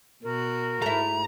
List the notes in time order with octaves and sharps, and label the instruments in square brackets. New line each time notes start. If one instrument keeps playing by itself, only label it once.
[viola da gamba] B2 F#4 [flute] A#4
[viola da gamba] G#2 [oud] A3 E4 [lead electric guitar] A#5